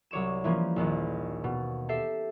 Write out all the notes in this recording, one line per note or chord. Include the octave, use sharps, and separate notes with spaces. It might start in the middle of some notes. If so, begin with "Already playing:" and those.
C2 F#3 C#5 D6 E7
E3 F3 A#3 C#4
A#1 D#2 D#3
B2
G4 A4 E5 C7